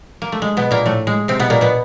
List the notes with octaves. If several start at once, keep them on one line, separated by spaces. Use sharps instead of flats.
A#3
A3
G#3
B2 B3
A#2 A#3
A2 A3
G#3
C3 C4
B2 B3
A#2 A#3
B2 B3